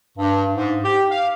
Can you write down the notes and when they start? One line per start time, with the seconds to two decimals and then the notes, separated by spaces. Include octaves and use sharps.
0.18 G2
0.55 G#2
0.85 G4
1.11 F5